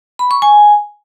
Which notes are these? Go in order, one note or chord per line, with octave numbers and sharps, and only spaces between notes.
B5
C#6
G#5